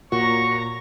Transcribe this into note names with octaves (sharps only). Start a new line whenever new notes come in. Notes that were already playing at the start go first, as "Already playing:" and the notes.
A#2 F#4 C#5 A#5 C#6